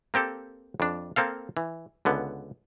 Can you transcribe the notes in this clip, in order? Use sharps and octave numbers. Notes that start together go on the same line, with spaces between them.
A#3 C4 G4 A4
F2 D4
A#3 C4 A4 F5
E3
C#2 D3 B3